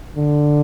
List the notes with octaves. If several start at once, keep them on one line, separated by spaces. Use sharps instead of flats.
D3